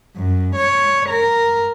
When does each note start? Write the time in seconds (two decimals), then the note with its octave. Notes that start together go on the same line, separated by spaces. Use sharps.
0.16 F#2
0.56 C#5
1.09 A#4